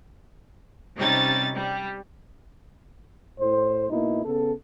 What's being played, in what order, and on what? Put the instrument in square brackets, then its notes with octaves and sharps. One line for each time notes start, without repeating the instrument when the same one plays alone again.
[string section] C3 G3 C#4 D#4 A6
G3
[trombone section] A2 C5
B2 A#3 D#4 E4
C#3 B3 A4